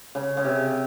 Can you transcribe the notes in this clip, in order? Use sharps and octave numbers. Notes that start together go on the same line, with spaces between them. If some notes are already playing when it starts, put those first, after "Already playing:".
C#3
C#3
C3